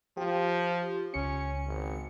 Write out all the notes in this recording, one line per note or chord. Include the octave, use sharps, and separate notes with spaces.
F3 F4 G4
C#2 C#4 C#7
G#1